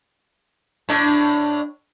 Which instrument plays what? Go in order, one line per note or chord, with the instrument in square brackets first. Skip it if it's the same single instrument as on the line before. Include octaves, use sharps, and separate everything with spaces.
[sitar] A2 D4